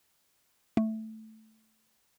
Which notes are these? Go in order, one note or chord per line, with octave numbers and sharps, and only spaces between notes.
A3